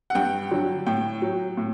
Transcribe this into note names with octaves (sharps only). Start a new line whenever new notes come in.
F#5
G2 G5
D3 F#3
A2 G5
F#3
A2